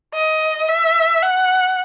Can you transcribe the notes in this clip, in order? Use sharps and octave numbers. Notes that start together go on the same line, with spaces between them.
D#5
E5
F#5